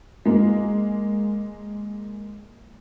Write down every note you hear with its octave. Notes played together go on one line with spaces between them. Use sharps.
G#3 A#3